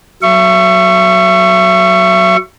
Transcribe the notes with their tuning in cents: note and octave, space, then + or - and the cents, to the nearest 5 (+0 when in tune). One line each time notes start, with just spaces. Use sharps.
F#3 +0 E5 +35 C#6 +0